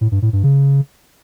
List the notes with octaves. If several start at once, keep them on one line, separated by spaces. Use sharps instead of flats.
A2
G2
A2
G2
C#3